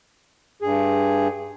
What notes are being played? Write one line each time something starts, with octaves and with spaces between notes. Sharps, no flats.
G2 G#4